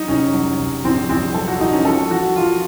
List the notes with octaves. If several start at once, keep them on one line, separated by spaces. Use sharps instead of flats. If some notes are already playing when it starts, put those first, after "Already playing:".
Already playing: F#3 D#4
F1 C#4
F#3
F1
A#1 C4
A#1 C4
F#3 A4
F#4
A#1 D#4
C#4
F3 A4
F3 F#4
F3 F4